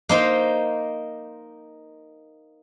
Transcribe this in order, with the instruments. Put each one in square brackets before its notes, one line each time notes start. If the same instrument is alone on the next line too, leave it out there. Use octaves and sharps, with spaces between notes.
[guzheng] A#3 D#4 C5